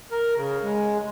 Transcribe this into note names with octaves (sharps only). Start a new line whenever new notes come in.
A#4
C#3
G#3